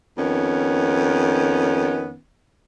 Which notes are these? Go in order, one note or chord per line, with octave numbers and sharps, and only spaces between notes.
F2 D#3 B3 C#4